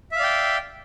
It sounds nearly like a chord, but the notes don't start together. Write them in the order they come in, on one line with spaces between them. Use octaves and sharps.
E5 F5 D5 G5